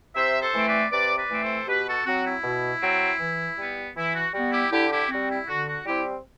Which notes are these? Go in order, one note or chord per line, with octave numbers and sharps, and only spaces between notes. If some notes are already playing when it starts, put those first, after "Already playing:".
C3 C5 E5
A4 C5
E3 A3 C4
B4 D5
C3 B4 D5
B4 D5
E3 A3 C4
A4 C5
B2 G4 B4
F#4 A4
F#3 C4 F#4
E4
B2
F#3 C4
E3
G3 B3
E3 E4
F#4
G3 B3 F#4
E4 G4
D3 E4 G4
E4 G4
G3 C4 F#4
E4
D3 F#4
F#4
G3 C4 E4 G4